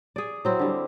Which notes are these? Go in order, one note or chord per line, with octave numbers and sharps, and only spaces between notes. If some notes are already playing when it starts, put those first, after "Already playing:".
G#4 D5
F#3 C4 E4
D3 G3